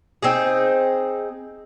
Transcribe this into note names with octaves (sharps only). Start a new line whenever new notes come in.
C4 D#4 G#4